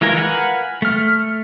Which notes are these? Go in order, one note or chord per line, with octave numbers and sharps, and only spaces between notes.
E3 G#3 F4 A#4 G#5
A#4 B4 F5 F#5 G#5
A3 F6